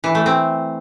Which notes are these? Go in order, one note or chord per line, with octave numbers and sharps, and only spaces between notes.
E3
A3
C4